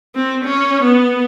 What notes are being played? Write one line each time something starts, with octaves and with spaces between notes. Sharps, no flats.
C4
C#4
B3